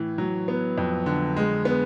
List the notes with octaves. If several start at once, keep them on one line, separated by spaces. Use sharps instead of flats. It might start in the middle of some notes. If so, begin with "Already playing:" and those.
Already playing: A2 E3
F#3
B3
F2
D3
G#3
B3